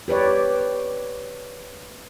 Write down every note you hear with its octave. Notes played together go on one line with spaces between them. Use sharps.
G4 B4 C#5 D5